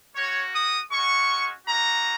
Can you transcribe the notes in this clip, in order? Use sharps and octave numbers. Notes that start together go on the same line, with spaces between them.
A#3 F#4 C#5
D#6
G#3 C#4 F#4 C#6
A#3 D#4 F#4 A#5